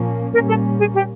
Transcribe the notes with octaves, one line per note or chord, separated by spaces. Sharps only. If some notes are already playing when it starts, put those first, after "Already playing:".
Already playing: A#2 F3 A#3 C#4
A#2 G3 A#3 C#4 A#4
A4
G#4
G4